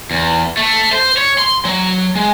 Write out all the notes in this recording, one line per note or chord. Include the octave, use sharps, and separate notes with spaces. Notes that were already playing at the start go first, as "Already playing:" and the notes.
E2
A3
C5
C#5
C6
F#3
G#3